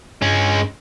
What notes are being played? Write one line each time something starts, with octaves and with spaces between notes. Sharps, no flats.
G2 G#3 C#4